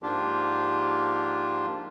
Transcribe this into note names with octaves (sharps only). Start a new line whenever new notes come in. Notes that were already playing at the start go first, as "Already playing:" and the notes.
G#2 F3 A#3 D4 F4 G4